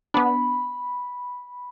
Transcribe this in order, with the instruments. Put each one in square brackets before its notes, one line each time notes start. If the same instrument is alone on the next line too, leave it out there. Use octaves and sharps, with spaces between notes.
[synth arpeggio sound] B3 D4 [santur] B5